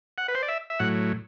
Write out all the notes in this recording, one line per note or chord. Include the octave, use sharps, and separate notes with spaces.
F#5
B4
C5
D5
E5
E5
A2 F#3 F#5